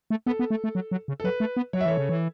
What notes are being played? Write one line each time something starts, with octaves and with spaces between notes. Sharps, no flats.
A3
B3 A4
B3
A3
A3
F#3
F#3
C#3
A4
F#3 B4
A3
B3
F#3 C#5
E5
E3 A4 C#5
C#3
E3